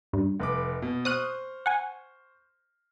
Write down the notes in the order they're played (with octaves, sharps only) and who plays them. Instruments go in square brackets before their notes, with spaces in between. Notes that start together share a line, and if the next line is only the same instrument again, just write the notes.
[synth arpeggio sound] G2
[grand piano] F1 B4 D6
B2
[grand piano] C5 C#6 F6 [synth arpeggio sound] D#6 F#6 D#7
[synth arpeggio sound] F#5 G#5